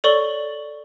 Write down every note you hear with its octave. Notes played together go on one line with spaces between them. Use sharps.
A4 C#5 D5 C#6 F#7 G7